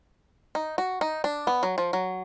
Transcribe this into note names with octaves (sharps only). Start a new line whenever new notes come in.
D#4
F#4
D#4
D4
B3
F#3
F3
F#3